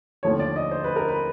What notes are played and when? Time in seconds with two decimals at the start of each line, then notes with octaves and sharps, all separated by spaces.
0.23 D#2 D3 F3 A3 C#5
0.39 D5
0.56 D#5
0.71 C5
0.84 B4
0.96 A#4
1.08 B4